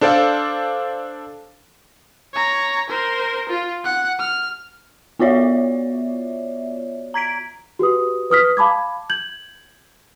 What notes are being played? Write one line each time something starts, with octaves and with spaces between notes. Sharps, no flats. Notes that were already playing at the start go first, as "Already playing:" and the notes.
D4 A4 C5 D5 F5
C#5 A#5
A#4 C5
F4
F#5 F#6
F6
B3 F4 F#4 C#5 D5 E5
A#5 G#6 B6 D7
F#4 G4 B4 D#6
B4 D#6 F6 B6
F5 A5 B5 D6 G#6
G6 G#6 F#7